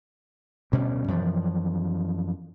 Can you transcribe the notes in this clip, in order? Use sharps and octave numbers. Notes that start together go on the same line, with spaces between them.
D2 B2 G3 C#4
F#2 E3 F3